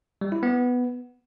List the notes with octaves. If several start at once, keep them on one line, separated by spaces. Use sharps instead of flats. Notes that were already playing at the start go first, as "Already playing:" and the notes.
G3
E4
B3